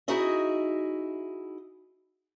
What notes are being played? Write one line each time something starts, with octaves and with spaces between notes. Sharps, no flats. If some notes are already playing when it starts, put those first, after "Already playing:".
D#4 E4 F#4 G#4 D#5 E5